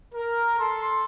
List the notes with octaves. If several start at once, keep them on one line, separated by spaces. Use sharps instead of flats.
A#4
A4 C6